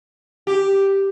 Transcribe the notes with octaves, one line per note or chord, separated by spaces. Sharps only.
G4